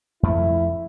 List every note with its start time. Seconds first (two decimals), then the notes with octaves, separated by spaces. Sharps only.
0.23 F2 F3 A3 E4